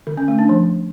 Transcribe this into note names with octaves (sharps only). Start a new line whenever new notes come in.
D3
C#4
A3
D4
F3